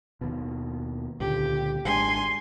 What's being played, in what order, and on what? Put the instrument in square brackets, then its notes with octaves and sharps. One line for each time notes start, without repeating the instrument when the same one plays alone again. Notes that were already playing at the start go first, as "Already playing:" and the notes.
[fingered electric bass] D#2 B2
[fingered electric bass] C#2 A#2 D3 [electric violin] G4
[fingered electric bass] G#1 G#3 D4 [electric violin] G#5 C6